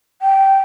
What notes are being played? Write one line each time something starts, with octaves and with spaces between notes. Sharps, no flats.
G5